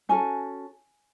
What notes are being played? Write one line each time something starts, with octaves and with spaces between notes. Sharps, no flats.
C#4 F#4 A4 G#5